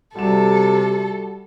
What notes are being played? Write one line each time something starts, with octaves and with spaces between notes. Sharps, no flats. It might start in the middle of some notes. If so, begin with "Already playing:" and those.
C3 G3 F#4 A4 E7